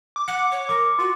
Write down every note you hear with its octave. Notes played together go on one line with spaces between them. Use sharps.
D6
F#5 C#7
C#5
A#4 D6
F4 F#4